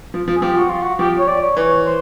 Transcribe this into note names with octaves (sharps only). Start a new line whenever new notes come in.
F3
F3
G#4
F3 G4
F#4
F4
F#4
F3 G4
C#5
D5
C#5
E3 C#5
C5